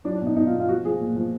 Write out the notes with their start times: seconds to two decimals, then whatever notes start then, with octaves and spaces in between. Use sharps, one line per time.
0.04 F#3 D4
0.15 D4
0.21 B2 D#4
0.36 B2 D#4
0.47 F4
0.53 B2
0.60 F4
0.68 F3 F#4
0.85 F3 G#4
1.00 A#2
1.16 F3